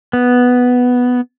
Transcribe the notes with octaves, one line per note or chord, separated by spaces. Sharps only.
B3